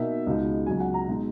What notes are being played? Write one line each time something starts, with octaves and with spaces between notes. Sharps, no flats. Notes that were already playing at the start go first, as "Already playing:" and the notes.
Already playing: B2 A#3 D#4 E5
C#2 B2 G#3 D#4
C#2 B2 F#3 G#5
F#5
A#5
B2 G#3 D#4